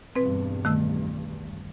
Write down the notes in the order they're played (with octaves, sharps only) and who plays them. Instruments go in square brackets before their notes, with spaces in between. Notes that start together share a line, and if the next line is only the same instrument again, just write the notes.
[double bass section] B1 E2 G2 [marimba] C4 B4
[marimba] D#3 A3 E6